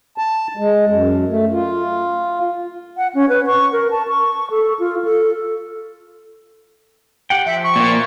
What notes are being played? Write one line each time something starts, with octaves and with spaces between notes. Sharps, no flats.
A5
G#3
F#2
A3
F4
F#5
C#4
B4
C#6
A#4
A5
C#6
A4
F4
A4
G4 F#5 G5
F3 E5
C#6
A#2 A#3